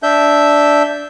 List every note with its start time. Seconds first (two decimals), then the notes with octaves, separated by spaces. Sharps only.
0.03 D4 E5 G6